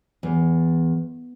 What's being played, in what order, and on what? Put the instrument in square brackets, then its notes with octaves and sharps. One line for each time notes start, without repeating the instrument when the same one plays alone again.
[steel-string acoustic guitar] E2